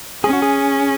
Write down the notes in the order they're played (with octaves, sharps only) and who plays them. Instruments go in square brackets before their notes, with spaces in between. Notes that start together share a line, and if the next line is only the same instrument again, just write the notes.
[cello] C#4 [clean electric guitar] G#4
[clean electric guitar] F#4
G#4